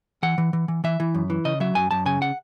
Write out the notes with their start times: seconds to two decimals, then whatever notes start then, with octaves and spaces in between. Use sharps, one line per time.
0.23 E3 F#5
0.38 E3
0.53 E3
0.68 E3
0.84 E3 E5
1.00 E3
1.15 F#2
1.30 E3
1.45 C#3 D#5
1.60 F#3 E5
1.75 F#2 G#5
1.91 F#2 A5
2.06 C#3 G#5
2.22 F#5